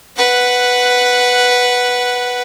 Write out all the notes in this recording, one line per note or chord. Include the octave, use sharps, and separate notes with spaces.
B4 F#5